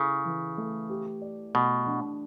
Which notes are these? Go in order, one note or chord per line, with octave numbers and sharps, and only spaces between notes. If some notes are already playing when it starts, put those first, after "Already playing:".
Already playing: C#3 E4 A4
E3
A3
G4
D5
B2 A3
D4